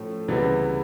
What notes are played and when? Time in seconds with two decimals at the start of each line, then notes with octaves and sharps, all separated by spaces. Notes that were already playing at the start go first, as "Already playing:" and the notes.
Already playing: A2 F3 A3 C#4
0.28 C#2 C3 E3 G3 B3